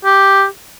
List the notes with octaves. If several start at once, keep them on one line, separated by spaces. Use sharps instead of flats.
G4